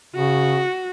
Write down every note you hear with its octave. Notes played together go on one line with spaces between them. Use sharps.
C#3 F#4